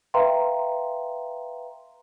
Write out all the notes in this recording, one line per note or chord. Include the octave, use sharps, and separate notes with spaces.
B4 E5 F5 G5 A#5 C6